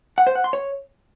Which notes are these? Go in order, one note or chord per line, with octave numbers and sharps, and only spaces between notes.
F#5
C5
F#5
C6
C#5